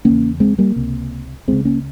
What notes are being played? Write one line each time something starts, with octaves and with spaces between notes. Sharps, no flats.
E2 C#3 A#3 C#4
G#3 C4
G3 A#3
C#2 C3
C#2 C#3 G#3 C4
A#3 C#4